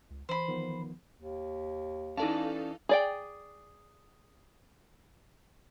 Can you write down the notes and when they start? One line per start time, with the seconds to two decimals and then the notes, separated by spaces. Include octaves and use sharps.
0.10 C#2
0.29 E3 C5 B5
0.48 D#3 F3 B3
1.18 D#2
2.17 E3 C#4 D#4 A4 D5 F5 A5
2.89 G#4 D5 G5